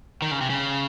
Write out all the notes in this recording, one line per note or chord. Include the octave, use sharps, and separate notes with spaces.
D#3
C#3
C3
C#3